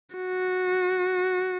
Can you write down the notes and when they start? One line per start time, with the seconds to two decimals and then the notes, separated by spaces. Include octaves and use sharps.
0.16 F#4